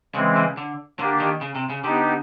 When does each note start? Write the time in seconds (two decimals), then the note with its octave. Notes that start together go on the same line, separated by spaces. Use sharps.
0.15 C#3 E3 G#3 C4
0.36 C#3
0.57 D3
0.99 D3 A#3 D4 G4
1.20 D#3
1.41 C#3
1.55 C3
1.70 C#3
1.83 D3 B3 D#4 G4